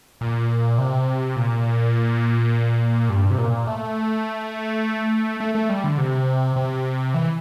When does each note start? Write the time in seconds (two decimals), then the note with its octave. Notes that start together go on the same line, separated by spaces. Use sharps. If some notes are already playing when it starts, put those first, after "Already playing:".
0.21 A#2
0.78 C3
1.36 A#2
3.09 G2
3.31 C3
3.38 A#2
3.67 A3
5.40 A3
5.55 A3
5.69 G3
5.84 D3
5.98 C3
6.56 C3
7.14 E3